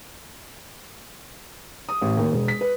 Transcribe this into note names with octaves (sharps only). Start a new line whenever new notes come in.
D#6
A1
D#2
E1
B6
B4